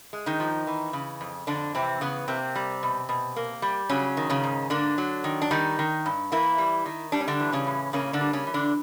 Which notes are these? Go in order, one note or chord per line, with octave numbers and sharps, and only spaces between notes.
G#3
D#3 D#4
F3
E3
C#3
F2
F2 D3 D4
C3 E3 C4
C#3 B3
C3 A#3 C4
G3
B2
B2
A#3
G3
C#3 F#3 C#4
D#3
C#3 C#4
G#2
D3 A#3 D4
F#3
D#3
D4
D#3 G3 D#4
D#3
G2
E3 A#3 E4
G3
D#3
G3 D4
C#4
D3 D4
E3
C#3 C#4
A2
C#3 A#3 C#4
D3 D4
G3
C#3 C#4
E3
D3 D4